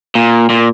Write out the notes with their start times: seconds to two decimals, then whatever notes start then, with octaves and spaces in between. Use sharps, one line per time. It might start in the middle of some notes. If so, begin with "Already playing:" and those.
0.15 A#2
0.50 A#2